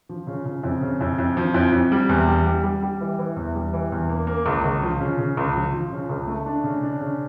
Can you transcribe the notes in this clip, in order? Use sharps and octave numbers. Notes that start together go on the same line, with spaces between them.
F3
C#3
C#3
F2
C#3
F2
F2
F3
F2
F2
G3
E2
G3
G3
G3
G3
E3
E3
E2
G3
E3
E2
A#3
A#3
C#2
C#2
F3
C#3
C#3
C#2
F3
F3
C#3
C#2
A3
D4
C#3
D4
C#3